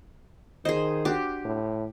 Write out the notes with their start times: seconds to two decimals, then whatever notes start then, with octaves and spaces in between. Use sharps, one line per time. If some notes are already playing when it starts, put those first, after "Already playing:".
0.65 D#3 G#4 C5 D#5
1.05 D4 F#4 G4
1.45 A2